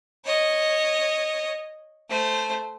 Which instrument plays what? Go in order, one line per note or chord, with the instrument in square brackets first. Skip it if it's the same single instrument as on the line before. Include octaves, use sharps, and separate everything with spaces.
[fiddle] C#5 D#5
A3 C5